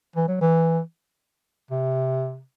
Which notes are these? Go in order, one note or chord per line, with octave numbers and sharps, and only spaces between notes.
E3
F#3
E3
C3